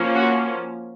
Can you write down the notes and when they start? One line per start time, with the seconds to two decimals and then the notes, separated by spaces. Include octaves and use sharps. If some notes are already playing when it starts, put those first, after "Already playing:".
Already playing: F3 A#3 C#4
0.16 F#4